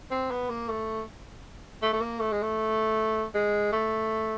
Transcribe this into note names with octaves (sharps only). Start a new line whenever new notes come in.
C4
B3
A#3
A3
A3
A3
A#3
A3
G#3
A3
G#3
A3